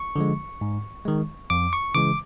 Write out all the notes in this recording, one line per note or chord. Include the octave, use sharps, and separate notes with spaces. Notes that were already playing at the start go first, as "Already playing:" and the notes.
Already playing: C#6
D3 F3 G#3
G#2
D#3 G#3
F2 D6
C#6
C#3 E3 G#3 D6